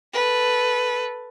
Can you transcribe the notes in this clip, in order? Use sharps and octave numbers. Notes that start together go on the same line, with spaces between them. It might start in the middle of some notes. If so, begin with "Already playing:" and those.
A4 B4